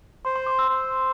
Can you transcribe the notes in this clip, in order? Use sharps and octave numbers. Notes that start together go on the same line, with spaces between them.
C5 C6
C6
D6
E6
C5